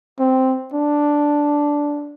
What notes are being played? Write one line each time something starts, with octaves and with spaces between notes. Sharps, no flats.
C4
D4